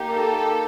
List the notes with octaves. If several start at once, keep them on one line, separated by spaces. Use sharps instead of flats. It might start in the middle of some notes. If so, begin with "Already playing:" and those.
Already playing: A#3 D#4 G4
A4